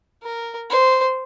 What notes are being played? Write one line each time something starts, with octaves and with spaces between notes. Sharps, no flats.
A#4
C5